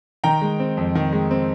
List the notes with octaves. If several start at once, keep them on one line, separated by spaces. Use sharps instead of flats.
D#3 G5 A#5
G#3
C4
F2
D#3
G#3
C4